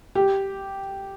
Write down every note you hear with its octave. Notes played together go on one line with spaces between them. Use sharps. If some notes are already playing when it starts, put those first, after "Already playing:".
G4